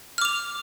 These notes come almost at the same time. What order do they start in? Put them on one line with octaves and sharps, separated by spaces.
F6 D6 F7